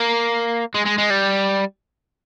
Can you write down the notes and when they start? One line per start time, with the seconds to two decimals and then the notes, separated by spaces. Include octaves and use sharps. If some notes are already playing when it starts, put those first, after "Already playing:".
Already playing: A#3
0.74 G#3
0.85 G#3
0.98 G#3
1.10 G3